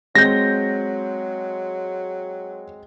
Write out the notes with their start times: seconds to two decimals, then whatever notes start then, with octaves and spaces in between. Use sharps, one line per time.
0.15 F#3 G#3 C4 G6 A#6